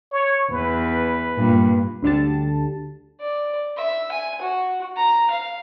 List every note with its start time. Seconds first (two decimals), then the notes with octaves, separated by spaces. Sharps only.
0.12 C#5
0.51 E2 B4
1.37 G2 A#2
2.03 D2 D3 G3 A5
3.21 D5
3.77 E5
4.12 G#5
4.42 F#4
4.97 A#5
5.31 F5